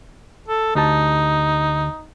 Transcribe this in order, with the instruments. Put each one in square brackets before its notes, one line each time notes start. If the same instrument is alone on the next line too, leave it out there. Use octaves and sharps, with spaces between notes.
[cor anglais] A4
[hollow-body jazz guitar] D2 G4 A5 [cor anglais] D#4